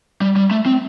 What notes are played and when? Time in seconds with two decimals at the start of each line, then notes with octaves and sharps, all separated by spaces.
0.21 G3
0.36 G3
0.51 A3
0.66 C4